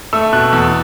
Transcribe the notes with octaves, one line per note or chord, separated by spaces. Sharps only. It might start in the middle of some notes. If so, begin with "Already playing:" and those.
A3 E6
B2 F#6
E2 E6